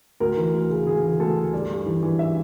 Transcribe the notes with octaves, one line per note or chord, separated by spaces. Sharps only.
D2 A#4
E3
D2
C#3
D2 G#4
E3
D2 A4
C#3
G2 D5
G2
E3
E3
E5